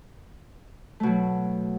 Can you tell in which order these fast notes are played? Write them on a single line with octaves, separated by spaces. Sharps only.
A3 B2 F#3